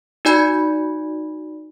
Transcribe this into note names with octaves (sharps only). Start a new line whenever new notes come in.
D#4 F#4 D5 G#5 B5 G#6